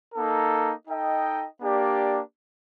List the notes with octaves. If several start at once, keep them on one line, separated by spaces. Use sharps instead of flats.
A#3 D#4 A4
D#4 A4 D#5 G5
A#3 D4 G4 D5